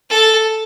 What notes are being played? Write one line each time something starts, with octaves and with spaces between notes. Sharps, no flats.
A4